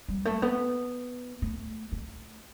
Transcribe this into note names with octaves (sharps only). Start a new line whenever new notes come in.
G3
A3
B3
A3
A3